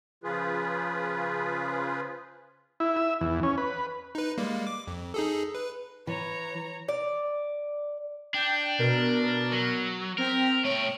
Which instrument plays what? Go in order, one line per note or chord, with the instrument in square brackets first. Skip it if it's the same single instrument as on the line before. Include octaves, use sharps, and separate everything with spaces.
[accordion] C#3 F3 F4 G#4 B4
[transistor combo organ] E4
E5
E2
C#4
B4
[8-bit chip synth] D#4 B4
G3 G#3 A#3
D6
F2
D#4 G#4 A4
B4
[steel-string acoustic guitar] E3 [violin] C#5 A#5
[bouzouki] D5
[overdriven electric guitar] D4 [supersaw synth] G5 G6
[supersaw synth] B2 A#4
[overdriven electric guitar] F#3
[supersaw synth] C4 G5 B6 [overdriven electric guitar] A#4
[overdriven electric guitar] A3 G5 [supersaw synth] C#5